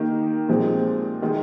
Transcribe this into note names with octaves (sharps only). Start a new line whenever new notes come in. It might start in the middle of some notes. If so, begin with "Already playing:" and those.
Already playing: D#3 A#3 D#4 G4
A#2 F3 G#3 C4 G4
D#3 G#3 D#4